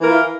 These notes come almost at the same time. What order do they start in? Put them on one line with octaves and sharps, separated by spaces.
E3 A#4 F4 E4